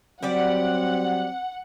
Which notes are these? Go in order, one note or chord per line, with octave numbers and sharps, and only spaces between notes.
F#3 G3 C4 G4 D5 F#5